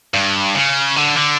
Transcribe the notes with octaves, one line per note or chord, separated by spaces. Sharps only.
G2
C#3
D3
D3